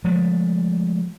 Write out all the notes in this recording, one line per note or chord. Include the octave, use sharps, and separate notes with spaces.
F3 G#3 A3